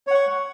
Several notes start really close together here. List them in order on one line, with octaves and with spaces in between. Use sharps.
C#5 F#5 C#6